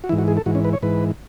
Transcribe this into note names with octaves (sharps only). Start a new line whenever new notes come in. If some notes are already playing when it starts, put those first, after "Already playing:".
F#4
G#2 E3 E4
F#4
G#4
A4
G#2 E3 F#4
C#4
B4
C#5
G#2 E3 B4